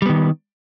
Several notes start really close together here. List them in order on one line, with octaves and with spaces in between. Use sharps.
G3 B3 D#3